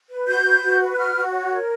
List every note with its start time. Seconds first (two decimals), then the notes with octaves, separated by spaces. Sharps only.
0.09 B4
0.27 F#4 G6
0.44 B4
0.63 F#4
0.81 B4
0.93 F#6
0.97 F#4 F6
1.16 F#4
1.33 C#5
1.50 A#4